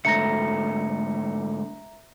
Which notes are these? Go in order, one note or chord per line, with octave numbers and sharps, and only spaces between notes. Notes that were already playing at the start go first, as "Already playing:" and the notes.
G#2 D3 A3 E5 A#5 A#6 C#7